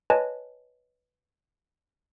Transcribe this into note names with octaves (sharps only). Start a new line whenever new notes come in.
B4 C#5 D#5 G#5 A5